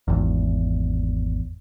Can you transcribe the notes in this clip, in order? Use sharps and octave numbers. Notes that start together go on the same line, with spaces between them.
G#1 E2